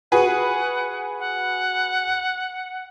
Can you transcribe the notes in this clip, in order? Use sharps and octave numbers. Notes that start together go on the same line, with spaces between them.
F#4 G#4 B4 F#5
F#5